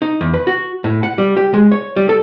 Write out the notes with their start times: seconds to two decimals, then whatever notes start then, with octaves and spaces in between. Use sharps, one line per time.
0.02 D#4
0.21 E2
0.34 B4
0.47 F#4
0.84 A2
1.03 F#5
1.18 G3
1.37 G4
1.54 G#3
1.72 C#5
1.96 G3
2.09 A4